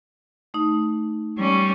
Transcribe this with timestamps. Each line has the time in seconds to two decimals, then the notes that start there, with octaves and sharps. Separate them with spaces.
0.54 A3 D#4
1.37 G3 C#4